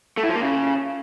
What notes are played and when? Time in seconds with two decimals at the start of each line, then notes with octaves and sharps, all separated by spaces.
0.17 A3
0.23 E4
0.29 F3
0.35 A#3
0.41 C#3